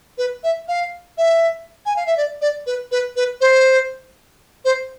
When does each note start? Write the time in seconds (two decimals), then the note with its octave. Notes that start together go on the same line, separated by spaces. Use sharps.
0.18 B4
0.43 E5
0.68 F5
1.17 E5
1.86 G#5
1.96 F5
2.06 E5
2.17 D5
2.41 D5
2.66 B4
2.91 B4
3.16 B4
3.41 C5
4.65 C5